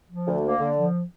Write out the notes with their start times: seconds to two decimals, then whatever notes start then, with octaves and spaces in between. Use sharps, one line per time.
0.09 F3
0.27 D2
0.43 A#3
0.60 D3
0.77 F3